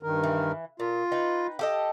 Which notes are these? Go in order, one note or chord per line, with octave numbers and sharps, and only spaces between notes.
G2 D#3 A#4
E3
A#2 F4
D#4 B4 G5
G4 A4 D#5